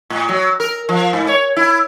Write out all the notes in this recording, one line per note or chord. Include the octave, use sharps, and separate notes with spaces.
A2
F#3
A#4
F3
G#2
C#5
E4